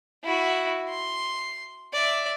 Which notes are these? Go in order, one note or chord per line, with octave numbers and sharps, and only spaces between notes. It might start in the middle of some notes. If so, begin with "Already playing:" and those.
E4 F#4
C6
D5 E5